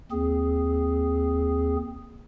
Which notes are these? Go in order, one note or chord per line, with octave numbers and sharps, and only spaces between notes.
D#2 C4 G#4